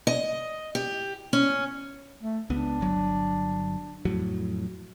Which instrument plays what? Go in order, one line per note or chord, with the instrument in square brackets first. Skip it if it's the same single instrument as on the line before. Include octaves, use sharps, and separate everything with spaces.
[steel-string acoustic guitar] D#5
G4
C#4
[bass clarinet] A3
[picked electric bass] C#2 B3 [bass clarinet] D4
[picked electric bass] G1 F#3
F2 A2 F#3